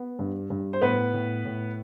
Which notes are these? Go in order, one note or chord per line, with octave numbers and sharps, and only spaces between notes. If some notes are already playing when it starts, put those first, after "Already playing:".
Already playing: B3
G2
G2
C5
A2 B3 B4
A2
A2